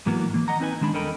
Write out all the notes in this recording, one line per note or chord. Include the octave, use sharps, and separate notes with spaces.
G#2 E3 F#3 A#3 B3
E3 A#3
D#5 F#5 A#5
C4 D#4 B4 G#5
D#3 G#3 D4 B5
E2 A4 A#4 D#5 G5 B5